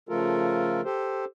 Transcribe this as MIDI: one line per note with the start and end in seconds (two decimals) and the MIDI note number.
0.09 0.81 49
0.09 0.81 53
0.09 0.81 57
0.09 0.81 65
0.09 0.81 69
0.09 0.81 70
0.85 1.25 67
0.85 1.25 69
0.85 1.25 72